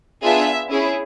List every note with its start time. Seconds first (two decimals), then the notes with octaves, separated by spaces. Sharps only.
0.23 B3 D4 F4 G#4 E5
0.70 C#4 E4 G#4